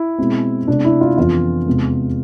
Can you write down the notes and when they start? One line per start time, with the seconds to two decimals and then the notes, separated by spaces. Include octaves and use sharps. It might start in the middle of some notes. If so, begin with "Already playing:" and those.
Already playing: E4
0.18 B2 G#3 C4
0.68 C3 G#3 B3 D4
0.85 E4
1.01 F4
1.18 F2 E3 B3 F4
1.67 E2 C3 G#3 B3